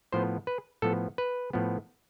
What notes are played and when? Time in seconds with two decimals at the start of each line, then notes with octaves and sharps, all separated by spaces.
0.12 A2 F3 B3 C5
0.47 B4
0.82 A2 F3 B3 A4
1.18 B4
1.53 A2 F3 B3